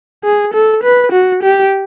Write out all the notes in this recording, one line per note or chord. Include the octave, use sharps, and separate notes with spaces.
G#4
A4
B4
F#4
G4